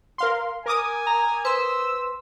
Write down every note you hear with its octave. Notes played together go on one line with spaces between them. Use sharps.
A#4 F5 C6
A#4 G#5 D6 D#6
A#5
B4 C5 C6 E6